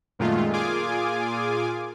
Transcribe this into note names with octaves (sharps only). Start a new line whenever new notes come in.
F#2 A#2 D#3 G#3 A3 F4
A#2 F4 G#4 G#5 D6